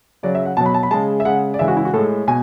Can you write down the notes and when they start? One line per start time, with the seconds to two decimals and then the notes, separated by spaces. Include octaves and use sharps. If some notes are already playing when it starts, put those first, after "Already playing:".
0.23 C#3 F#3 D5
0.35 E5
0.46 F#5
0.57 B2 F#3 A5
0.66 B5
0.74 A5
0.83 B5
0.91 C#3 G#3 A5
1.20 E5
1.25 C#3 G#3 F#5
1.54 D5
1.59 C#3 E3 G#3 E5
1.68 F#4
1.77 E4
1.85 F#4
1.93 A2 G#3 A4
2.28 B2 G#5